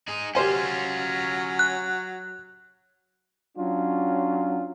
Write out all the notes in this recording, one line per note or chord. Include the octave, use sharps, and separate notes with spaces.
D#4 G#4
F#3 C#4 F4 G4 C5 G#5
F#6
F#3 C#4 D4 F4